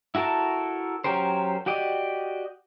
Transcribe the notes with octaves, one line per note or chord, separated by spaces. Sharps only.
E4 F#4 A4 A#4 A5
F#3 C#4 G4 A#4 C5
F#4 G4 D5 D#5